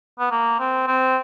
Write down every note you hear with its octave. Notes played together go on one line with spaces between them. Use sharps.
B3
A#3
C4
C4